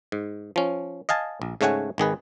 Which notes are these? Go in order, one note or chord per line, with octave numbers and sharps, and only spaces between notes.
G#2
F3 C#4
D#5 F5 G#5 A5
A#1
G#2 C#3 A3 C#5 F#5 G#5
G#1 D#3 G#4 B4